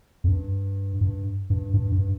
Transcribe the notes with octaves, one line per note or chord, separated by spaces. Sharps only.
F2
G2
G2
G2
G2
G2